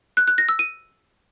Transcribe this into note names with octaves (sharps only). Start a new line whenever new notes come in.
F#6
F#6
A#6
E6
D#7